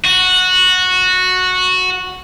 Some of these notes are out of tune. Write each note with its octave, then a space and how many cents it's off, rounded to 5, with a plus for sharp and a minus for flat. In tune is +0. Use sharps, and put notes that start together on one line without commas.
F#4 -10